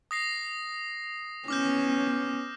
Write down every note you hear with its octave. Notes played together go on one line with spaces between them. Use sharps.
D#6 A#6 C7
B3 C#4 D6 F6 G6